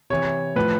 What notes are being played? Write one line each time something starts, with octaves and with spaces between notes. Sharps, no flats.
C3 E3 C#5
A2 F3 B4